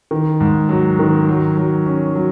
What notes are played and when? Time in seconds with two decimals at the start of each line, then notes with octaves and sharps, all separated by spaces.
0.11 D#3
0.40 G#2
0.69 F#3
0.99 D#3
1.28 F#3
1.57 F#3
1.86 C#4
2.15 F#3